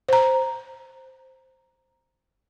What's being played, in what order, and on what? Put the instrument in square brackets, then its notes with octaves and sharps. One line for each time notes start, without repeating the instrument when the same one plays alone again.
[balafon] C5 A#5